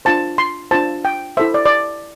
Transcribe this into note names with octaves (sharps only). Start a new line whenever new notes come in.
D4 F4 C5 A5
C6
D4 F4 C5 A5
G5
E4 A4 C5 E5
D5
D5